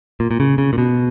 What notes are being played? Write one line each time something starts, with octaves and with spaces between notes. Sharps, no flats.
A#2
A#2
C#3
C#3
A#2
B2